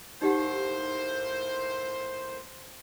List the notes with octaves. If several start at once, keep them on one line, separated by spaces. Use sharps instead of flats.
A2 A#3 D#4 G4 C5 F#5